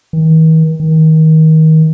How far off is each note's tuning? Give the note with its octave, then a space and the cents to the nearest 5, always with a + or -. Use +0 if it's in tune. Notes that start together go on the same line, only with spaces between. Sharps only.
D#3 +45
D#3 +25